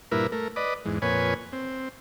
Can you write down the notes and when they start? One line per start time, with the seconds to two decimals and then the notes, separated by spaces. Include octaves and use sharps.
0.12 G2 A#2 E4 A#4 B4
0.32 A3 A#4
0.56 B4 D5 D#5
0.85 E2 G#2
1.02 F2 A#2 B4 C#5 G#5
1.52 C4